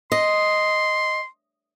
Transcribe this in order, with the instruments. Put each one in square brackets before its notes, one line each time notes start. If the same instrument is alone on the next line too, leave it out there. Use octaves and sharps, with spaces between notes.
[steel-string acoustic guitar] D#5 [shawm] C6